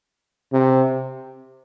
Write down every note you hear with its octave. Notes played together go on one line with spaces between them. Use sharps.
C3